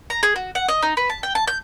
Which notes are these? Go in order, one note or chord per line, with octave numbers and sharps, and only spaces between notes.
A#5
G#4
F#4
F#5
D#5
D#4
B4
A5
G5
A5
G6